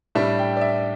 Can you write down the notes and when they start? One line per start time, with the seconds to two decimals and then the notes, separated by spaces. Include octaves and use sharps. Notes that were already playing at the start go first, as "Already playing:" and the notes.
0.15 A2 G3 D4 E5
0.39 G5
0.57 D5
0.61 E5